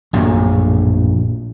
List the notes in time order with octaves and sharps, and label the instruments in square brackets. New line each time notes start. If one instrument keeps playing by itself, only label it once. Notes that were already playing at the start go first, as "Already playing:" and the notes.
[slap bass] A#1 F#2 A2